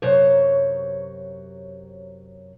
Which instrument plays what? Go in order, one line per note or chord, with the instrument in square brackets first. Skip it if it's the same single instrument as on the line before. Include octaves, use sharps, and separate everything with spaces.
[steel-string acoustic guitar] F#2 C3 F#3 C5 C#5